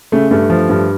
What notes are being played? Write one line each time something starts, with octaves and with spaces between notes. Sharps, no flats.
C#3 A3
G2 A3
F3
G2